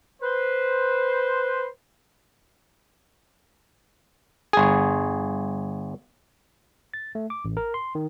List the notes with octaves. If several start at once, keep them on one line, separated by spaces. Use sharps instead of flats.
B4 C5
G1 G#4
A6
A3
D6
A1
A#4
C6
D#3